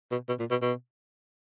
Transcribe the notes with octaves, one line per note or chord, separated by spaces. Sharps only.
B2
B2
A#2
B2
B2